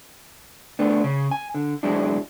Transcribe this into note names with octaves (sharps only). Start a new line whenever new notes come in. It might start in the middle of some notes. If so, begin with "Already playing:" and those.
A3 B3 D4
C#3
G#5
D3
E2 E3 F#3 G#3 D4 E4